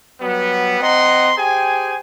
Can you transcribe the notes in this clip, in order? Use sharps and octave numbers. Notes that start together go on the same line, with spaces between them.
F#3 G3 B3
C4 D#5 F#5 A#5 C6
G4 G#4 C5 G5 G#5